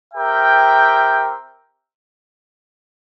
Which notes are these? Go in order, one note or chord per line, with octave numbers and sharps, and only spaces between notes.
C4 G4 A#4 E5 G5